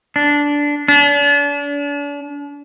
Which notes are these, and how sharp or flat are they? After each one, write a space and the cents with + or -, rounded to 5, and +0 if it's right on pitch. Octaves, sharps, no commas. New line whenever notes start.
D4 -10
D4 -40